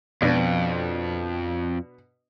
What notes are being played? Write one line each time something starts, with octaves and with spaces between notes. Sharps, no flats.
F2 B2 D4